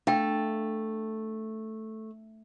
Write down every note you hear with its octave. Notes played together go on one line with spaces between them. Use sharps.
A3 D4 F5 G5